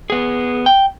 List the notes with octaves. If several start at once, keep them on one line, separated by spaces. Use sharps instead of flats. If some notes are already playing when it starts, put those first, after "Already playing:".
B3 G#4
G5